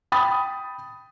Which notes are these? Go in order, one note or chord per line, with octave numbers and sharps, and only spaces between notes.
G5 B5 D#6 A6